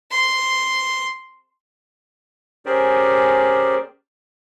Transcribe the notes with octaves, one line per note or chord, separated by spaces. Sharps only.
C6
C#4 G4 G#4 A#4 C5 D5